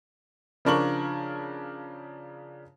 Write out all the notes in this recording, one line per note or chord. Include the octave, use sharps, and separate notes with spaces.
C#3 F3 D4 A#4 C#6 F#7